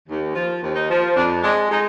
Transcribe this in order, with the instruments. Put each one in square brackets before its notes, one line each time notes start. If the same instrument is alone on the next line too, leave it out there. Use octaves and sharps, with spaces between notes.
[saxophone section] D#2
F3 F4
D#2
D#4
F3
F2 D4
G#3 D4
G#3 D#4